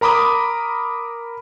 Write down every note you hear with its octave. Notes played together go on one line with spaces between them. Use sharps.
A#4 A#5 B5 D6 D#6